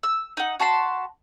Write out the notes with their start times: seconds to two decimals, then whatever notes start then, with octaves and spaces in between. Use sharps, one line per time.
0.03 E6
0.37 D#4 F#5
0.60 F#4 A5 B5 C6